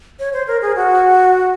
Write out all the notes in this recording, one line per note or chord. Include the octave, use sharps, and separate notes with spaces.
C#5
C5
A#4
G#4
F#4